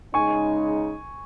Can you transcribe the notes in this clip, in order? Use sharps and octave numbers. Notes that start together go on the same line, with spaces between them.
C#3 G#3 D#4 G#5 C#6